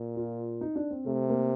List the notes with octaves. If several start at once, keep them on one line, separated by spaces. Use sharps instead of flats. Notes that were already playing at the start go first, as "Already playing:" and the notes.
Already playing: A#2
F4
D#4
D4
C4
C3 A3
A#3